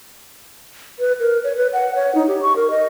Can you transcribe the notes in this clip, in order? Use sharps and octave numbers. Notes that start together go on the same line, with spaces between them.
B4
A#4
C#5
B4
F#5
C#5
D#4
G4
C#6
A#4
D#5